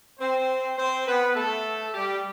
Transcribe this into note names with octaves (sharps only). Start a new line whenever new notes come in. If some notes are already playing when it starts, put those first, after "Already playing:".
C4 C5
C4 C5
B3 B4
A3 A4
G3 G4